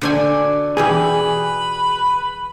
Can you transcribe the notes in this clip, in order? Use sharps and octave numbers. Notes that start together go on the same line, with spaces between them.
D3 F#4 A4 C5 D5 G#5
B2 E3 G4 G#4 B4 B5